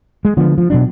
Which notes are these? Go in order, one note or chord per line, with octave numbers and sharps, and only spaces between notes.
G#3
D3 F3 B3
F3
B2 F#3 D4